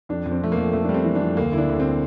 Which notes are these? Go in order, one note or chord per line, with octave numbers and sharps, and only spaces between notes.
F2 D4
F2
C4
F2 A3
A#3
F2
F2 A3
G3 D4
C4
E3
F2 D4
D2 A#3
D2 E4
D4
D2
C4